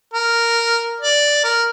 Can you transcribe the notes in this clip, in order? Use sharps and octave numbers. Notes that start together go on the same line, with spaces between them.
A#4
D5
A#4